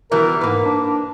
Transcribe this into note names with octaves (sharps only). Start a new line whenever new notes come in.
B2 E3 G3 A#4
G#2 A#3 B4
D4